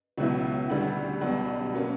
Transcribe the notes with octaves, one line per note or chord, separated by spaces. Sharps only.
C#2 B2 F#3 C#4 E4
D2 D3 G3
B1 B2 G3
F#3 A#3 C#4